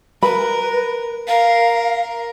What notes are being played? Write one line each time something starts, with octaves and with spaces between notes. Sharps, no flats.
A#4 B4 B5
A#4 F5